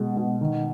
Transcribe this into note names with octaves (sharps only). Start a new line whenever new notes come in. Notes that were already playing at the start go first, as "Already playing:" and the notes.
Already playing: B2 G#3
B2
D#3